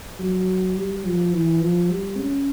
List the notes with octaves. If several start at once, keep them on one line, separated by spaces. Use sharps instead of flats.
F#3
G3
F3
E3
F3
G3
C#4